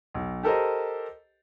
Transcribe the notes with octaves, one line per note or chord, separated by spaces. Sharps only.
B1
G4 A4 A#4 C5 D#5